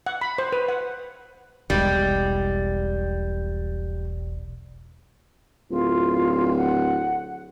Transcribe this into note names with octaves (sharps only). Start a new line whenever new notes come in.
F#5
B5
C5
B4
F#5
E1 B1 G3 G#3
D1 F4
F#5